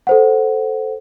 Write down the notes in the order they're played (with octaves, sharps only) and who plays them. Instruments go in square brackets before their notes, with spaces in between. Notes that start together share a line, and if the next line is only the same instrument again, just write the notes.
[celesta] A4 C5 F#5